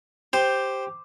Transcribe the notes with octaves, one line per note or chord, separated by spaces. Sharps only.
G4 C5